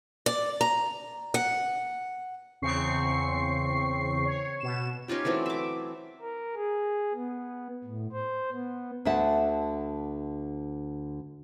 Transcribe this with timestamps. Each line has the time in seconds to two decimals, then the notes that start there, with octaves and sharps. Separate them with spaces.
0.26 D5
0.61 A#5
1.34 F#5
2.62 E2 C#3 C4 C#6 C7
4.25 C#5
4.60 B2 E7
5.08 C#4 D#4 F4 G4
5.25 E3 F#3 A3 C4
5.46 E5 D6
6.21 A#4
6.55 G#4
7.14 B3
7.84 A2
8.12 C5
8.51 B3
9.05 D2 D3 E5 F#5 A5